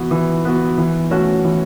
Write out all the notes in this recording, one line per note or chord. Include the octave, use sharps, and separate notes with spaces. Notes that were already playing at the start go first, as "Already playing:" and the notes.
Already playing: E3 B3 F#4
E3
B3 F#4
E3
A3 C#4 F#4
E3